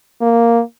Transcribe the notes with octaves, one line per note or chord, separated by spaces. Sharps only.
A#3